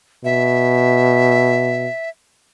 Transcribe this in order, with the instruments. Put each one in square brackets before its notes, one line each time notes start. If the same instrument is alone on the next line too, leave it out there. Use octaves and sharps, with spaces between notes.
[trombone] B2 [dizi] E5